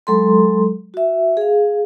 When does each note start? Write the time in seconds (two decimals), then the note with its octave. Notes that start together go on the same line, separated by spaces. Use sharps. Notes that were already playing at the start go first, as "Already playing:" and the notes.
0.07 F#3 G#3 A4 A#5 C6
0.94 F#4 E5
1.37 G#4 F5